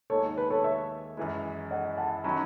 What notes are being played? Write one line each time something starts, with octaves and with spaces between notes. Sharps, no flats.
D#2 D#3 G#3 A4 C#5
B4
A4 C#5
C#5 E5
F#2 E3 G#3
D#5 F#5
F#5 A5
D#3 F#3 C#4 G#5 B5